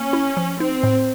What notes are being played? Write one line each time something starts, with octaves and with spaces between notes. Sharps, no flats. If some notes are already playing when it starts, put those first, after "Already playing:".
Already playing: A#3 C#4
E4
F3
C4 D#4
A2